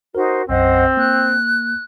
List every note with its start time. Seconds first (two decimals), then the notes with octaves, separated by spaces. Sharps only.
0.15 D#4 F#4 A#4 C5
0.49 B1 F#2 C4 C5 D#5 F#5
0.97 A#3 F#6